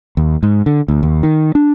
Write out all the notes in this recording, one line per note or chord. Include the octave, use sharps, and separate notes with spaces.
D#2
G#2
D3
D2
D#2
D#3
D4